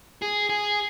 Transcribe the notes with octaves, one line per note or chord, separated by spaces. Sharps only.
G#4
G#4